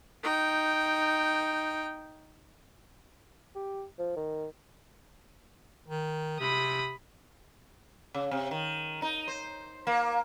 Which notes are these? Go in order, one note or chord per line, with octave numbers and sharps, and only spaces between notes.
D#4 G5
G4
F3
D#3
D#3
C3 B5 D#6
C#3
C3
D#3
D#4
C5
A#3